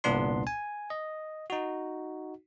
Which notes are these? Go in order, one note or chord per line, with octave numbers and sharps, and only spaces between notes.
G1 C2 A#2 B3 D4 C6
G#5
D#5
D#4 F#4